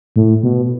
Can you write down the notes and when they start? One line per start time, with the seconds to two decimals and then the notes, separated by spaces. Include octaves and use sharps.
0.16 A2
0.43 B2